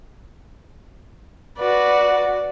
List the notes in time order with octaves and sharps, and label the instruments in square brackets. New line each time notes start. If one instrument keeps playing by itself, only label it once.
[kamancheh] F#4 B4 [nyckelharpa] D5